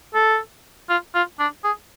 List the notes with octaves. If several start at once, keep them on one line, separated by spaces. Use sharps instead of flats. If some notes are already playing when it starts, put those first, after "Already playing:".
A4
F4
F4
D4
G#4